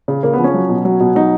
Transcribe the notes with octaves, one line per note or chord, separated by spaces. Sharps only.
C#3
C#3 A#3
B3
F3
C#4
F#3
B2
F#3
B2
F#3 D#4